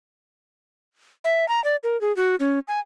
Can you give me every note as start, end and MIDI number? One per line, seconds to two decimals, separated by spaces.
1.24 1.48 76
1.49 1.63 82
1.64 1.76 74
1.83 1.99 70
2.01 2.15 68
2.16 2.36 66
2.40 2.59 61
2.68 2.80 80